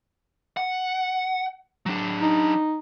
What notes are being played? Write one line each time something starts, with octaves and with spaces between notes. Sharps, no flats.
F#5
F#3 D4
D#4